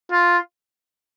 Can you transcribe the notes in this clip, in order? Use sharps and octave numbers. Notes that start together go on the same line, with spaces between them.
F4